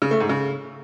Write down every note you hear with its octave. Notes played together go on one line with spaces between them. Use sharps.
C#3
A3
G#2
C#3